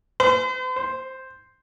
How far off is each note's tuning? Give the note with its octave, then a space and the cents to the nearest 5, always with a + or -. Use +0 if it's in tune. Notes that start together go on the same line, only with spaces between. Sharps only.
C5 -45
C5 +0